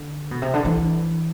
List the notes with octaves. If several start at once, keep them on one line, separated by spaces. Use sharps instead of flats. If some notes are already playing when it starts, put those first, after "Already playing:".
Already playing: D3
B2
C3
D3
E3